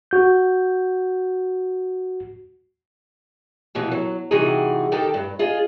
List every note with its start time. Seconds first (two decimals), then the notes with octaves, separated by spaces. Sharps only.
0.11 F#4 G6
3.75 F2 B2 E3
3.92 F#3
4.31 C3 E3 G3 D#4 F#4 G#4
4.92 D#3 D#4 G4 A4 A5
5.14 G2
5.39 F4 G#4 D#5